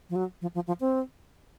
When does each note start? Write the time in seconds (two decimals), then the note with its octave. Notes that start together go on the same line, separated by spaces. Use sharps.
0.10 F3
0.16 F#3
0.42 F3
0.55 F3
0.67 F3
0.80 C4